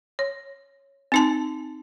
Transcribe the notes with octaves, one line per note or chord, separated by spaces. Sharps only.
C#5
C4 D#4 A5